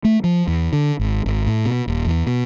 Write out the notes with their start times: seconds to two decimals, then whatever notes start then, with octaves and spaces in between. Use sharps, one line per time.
0.04 A3
0.24 F3
0.48 E2
0.73 D3
0.99 G#1
1.26 G#1
1.47 A2
1.66 B2
1.87 D#1
2.06 E2
2.27 B2